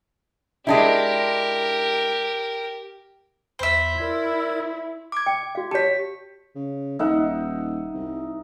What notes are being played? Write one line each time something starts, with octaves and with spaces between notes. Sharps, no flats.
G#3 D4 E4 G4 A#4
E2 C5 E5 B5
E4 A#4 D5 G#6
D6 G#6
G5
F#4 F5
G4 C#5 A5 B6
C#3
D#1 D#4 E5 F#5
C2